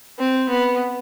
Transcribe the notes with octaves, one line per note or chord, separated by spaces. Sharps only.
C4
B3